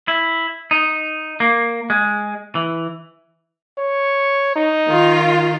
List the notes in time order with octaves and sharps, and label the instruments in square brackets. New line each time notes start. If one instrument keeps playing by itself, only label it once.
[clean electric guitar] E4
D#4
A#3
G#3
E3
[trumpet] C#5
D#4
[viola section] D#3 F4